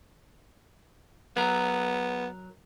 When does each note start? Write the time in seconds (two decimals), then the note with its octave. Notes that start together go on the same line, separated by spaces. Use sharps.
1.37 F#3 B3 A#4